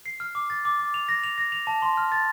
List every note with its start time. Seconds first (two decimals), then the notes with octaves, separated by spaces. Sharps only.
0.06 C7
0.20 F6
0.35 D6
0.50 A6
0.65 D6
0.79 D6
0.94 F7
1.09 A#6
1.24 F7
1.38 A#6
1.52 F7
1.67 A5
1.82 C6
1.97 F6
2.12 A6